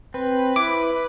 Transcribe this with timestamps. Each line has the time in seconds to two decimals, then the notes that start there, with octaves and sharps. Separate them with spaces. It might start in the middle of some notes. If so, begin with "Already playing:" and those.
0.14 C4 B4
0.56 E4 D6